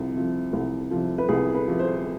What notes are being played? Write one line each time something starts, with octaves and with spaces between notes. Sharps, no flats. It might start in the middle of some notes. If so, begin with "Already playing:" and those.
Already playing: C2 C3 F3
C3 F3
C2
C3 F3
B4
C2 G#4
B4
C3 F3
C5